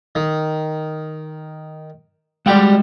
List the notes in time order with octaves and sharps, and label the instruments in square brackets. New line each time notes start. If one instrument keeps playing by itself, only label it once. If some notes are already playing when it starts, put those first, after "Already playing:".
[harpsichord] D#3
[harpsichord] G3 G4 F#5 [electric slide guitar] G#3 G5